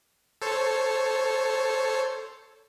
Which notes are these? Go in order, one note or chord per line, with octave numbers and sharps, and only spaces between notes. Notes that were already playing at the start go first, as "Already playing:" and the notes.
A4 C5 C#5